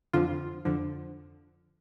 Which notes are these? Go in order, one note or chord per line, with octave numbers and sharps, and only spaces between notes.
F2 D3 F3 F4
F2 D3 F3